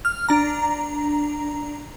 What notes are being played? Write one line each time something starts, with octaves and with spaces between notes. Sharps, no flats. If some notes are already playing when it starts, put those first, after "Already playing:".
F6
D4 A#5